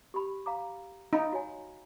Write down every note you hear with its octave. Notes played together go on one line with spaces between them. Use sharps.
G4 B5
F5 A#5 D6
D#4 F5 A#5 B5
F#4 C#5 G#5